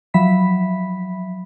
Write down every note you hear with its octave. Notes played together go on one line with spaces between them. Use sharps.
F3 F#3 E5 B5 B6